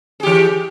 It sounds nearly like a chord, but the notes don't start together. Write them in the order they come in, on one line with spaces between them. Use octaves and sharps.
G#4 G4 E3